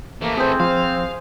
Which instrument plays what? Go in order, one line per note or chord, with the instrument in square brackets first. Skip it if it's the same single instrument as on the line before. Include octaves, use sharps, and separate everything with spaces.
[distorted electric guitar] E3 A3 [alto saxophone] A#3
[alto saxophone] C4 [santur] G#4 C5
[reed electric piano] F3 C6 [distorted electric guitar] F5